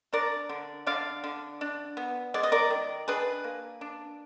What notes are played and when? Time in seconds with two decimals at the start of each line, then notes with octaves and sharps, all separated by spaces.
0.13 D4 A#4 D5
0.49 D3
0.87 D3 D5 F5
1.24 D3
1.61 D4
1.97 B3
2.34 G#3 D5
2.43 D#5
2.52 A#4 D5
2.70 D#3
3.08 D4 G#4 B4
3.44 A#3
3.81 D4